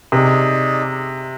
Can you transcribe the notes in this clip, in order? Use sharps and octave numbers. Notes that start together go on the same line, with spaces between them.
C3 D#4 G#4 D5